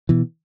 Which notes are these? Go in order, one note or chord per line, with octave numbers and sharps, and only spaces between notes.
B2 E3